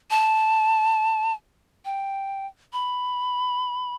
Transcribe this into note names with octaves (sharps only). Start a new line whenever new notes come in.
A5
G5
B5